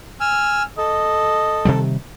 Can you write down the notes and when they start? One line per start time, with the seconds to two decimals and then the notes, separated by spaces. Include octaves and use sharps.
0.21 G#5 E6 F6
0.78 A4 D#5
1.65 C3 D#3 G3